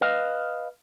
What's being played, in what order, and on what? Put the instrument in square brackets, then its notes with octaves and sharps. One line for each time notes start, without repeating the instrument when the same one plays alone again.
[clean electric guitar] B4 D#5 F5